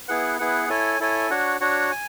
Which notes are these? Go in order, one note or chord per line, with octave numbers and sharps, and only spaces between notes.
B3 E4 G#4 B4 F#5
B3 E4 G#4 B4 F#5
E4 A4 C#5 G#5
E4 A4 C#5 G#5
D4 F#4 C#5 F#5
D4 F#4 C#5 F#5
G#5